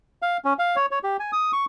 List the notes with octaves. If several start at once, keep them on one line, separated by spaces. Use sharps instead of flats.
F5
C#4
F5
C#5
C#5
G4
G#5
D#6
C#6